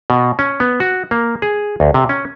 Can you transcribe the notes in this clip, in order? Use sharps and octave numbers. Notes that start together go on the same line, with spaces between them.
B2
C#4
B3
F#4
A#3
G#4
D2
C3
C#4